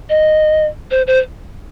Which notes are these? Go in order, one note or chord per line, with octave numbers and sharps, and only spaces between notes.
D#5
C5
C5